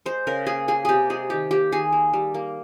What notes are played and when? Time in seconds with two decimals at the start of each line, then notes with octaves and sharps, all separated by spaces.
0.06 G#3 C5
0.27 C#3 A#4
0.47 A#3 G#4
0.68 A#3 G#4
0.85 C3 G4 G#4
1.10 G#3 G#4
1.30 D#3 G4
1.51 A#3 G4
1.72 D#3 G#4
1.92 A#3
2.13 G3
2.34 A#3